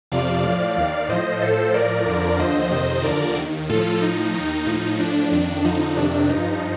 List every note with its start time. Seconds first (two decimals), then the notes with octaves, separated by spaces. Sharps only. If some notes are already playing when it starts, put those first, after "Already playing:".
0.12 F2 C3 F3 D5 F5
0.44 A2
0.49 F3
0.77 D#2 D#3 D5 F5
1.09 A2 F3 C5 D#5
1.41 A2 F3 A4 C5
1.74 A2 F3 A#4 D5
2.06 F2 D3 F3
2.39 D#2 D3 F3 C5 D#5
2.71 F2 C3 D#3 C5 D#5
3.04 D#2 D3 F3 A#4 D5
3.36 D#2 D#3
3.69 A2 F3 F4 A4
4.02 A2 F3 D#4
4.34 D#2 D#3
4.66 A2 F3 D#4
4.99 A2 F3 D4
5.32 F2 D#3
5.64 F2 D3 F3 D#4
5.96 F2 C3 D#3 D4
6.29 G2 F3 D#4